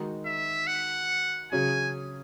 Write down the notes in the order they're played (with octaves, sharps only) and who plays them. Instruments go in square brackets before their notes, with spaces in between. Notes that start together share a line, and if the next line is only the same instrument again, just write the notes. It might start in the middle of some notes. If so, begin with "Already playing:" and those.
Already playing: [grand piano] D#3 G#3 D#4 F#4
[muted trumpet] E5
F#5
[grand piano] C#3 F#3 C#4 G#4 [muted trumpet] G#5